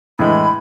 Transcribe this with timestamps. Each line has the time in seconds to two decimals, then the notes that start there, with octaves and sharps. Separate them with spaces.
0.19 A2 E3 G#3 B5